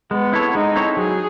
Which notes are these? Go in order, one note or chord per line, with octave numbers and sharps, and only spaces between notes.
G#3 B3
C4 E4 A4 C#5
G#3 D#4
C4 E4 A4 C#5
F#3 G#4